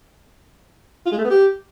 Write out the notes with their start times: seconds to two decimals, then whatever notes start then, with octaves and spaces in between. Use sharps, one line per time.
1.06 F4
1.12 G#3
1.18 A3
1.24 B3
1.30 G4